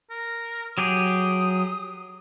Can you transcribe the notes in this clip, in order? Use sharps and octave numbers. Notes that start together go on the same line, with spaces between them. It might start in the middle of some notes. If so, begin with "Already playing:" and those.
A#4
F#3 G4 G#4 D#6